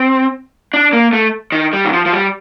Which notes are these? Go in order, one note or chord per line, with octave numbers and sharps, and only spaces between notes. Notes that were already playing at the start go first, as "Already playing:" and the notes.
Already playing: C4
D4
A#3
A3
D#3
G3
D#3
F3
F3
G3